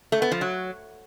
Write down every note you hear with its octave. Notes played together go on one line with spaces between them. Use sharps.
A3
B3
F3
F#3